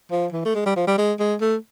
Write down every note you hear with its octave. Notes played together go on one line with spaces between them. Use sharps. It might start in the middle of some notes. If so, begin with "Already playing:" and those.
F3
E3
A3
G#3
G3
F3
G3
G#3
G#3
A3